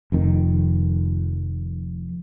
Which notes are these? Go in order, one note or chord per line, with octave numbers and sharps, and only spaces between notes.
F1 F2 D#3